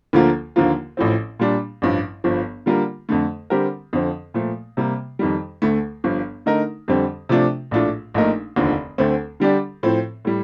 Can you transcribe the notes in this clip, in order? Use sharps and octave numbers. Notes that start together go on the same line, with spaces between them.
D2 D3 F3 A#3 F4
D#2 D3 F3 A#3 F4
A1 A2 F3 C4
A#2 G3 D4
A1 G2 F3
G1 G2 F3
D3 G3 A#3 F4 A#4
F2 D3 A3
D3 G3 C4 G4 A#4
F2 D3 F3 C4
A#2 F3 A3
C3 G3 A#3
F2 D#3 G3
D2 D3 A3
G1 G2 F3
D3 A3 D#4 A#4
F2 D3 G3 C4
C3 F3 A3 D4 F4
A#1 A2 A3 D4 F4
A#1 A#2 A3 D#4 A#4
F1 D#2 D3 F3
D2 D3 A3 C4
D3 G3 D4 G4 D5
A2 F3 C4
A2 G3